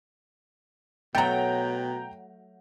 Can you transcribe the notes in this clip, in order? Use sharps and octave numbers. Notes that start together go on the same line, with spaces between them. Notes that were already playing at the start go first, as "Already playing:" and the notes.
B2 F#3 A3 G5 A#5